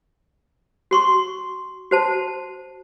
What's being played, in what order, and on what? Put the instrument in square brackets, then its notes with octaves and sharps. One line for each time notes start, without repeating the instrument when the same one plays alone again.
[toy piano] F#4 C6 C#6
F#4 C5 A5